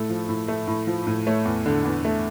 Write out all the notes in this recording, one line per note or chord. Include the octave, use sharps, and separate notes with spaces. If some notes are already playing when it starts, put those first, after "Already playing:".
Already playing: A2 A3 A4
F3
A2
A3
A2
F3
A2
A3 C#5
E2
D3
E2
A3